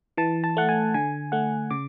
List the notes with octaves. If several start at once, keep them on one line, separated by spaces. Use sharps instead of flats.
E3 A5
A5
A3 F#5
G#5
D3 G#5
A3 F#5
C#3 D6